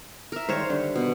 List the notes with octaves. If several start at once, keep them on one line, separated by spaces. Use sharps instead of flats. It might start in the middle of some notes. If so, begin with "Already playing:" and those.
A#4 E5
G2 D#3 G#3 C5 C#5
D3 D#3 G3
B2